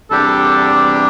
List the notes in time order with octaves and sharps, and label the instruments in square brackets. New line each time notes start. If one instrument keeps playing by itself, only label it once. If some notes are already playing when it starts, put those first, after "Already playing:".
[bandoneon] E2 C3 G3 D4 G4 [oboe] A4